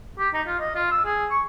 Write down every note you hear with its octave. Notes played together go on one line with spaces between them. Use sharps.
G4
D#4
F4
D#5
F4
E6
G#4
C#6